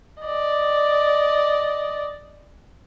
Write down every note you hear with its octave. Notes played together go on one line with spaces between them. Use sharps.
D5 D#5